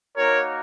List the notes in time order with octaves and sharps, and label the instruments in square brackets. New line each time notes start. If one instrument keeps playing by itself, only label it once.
[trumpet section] A#3 D#4 F#4 A#4 C#5